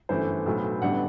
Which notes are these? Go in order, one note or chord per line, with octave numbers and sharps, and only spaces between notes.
G1 F#2 E3 A3 C5
B1 A2 F#3 B3
A1 G2 D3 G3 B3 F#5